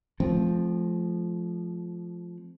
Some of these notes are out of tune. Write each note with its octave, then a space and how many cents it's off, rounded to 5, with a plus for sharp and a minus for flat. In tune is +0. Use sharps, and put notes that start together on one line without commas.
F3 +0 A3 -35 C4 +0